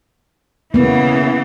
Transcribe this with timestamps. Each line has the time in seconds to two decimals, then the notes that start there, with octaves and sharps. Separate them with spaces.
0.74 C#3 E3 A#3 B3